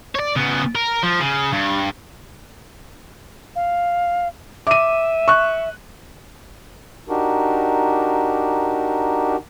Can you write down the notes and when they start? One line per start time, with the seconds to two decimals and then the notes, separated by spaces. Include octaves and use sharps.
0.15 C#5 D5
0.36 C#3 B3
0.75 A#4
1.03 F3
1.20 C#3
1.53 G2
3.56 F5
4.67 E5 D6 D#7
5.28 C#6 F#6
7.09 D4 D#4 F#4 G4 A#4